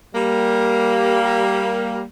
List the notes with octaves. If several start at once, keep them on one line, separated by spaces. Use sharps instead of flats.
G3 A#3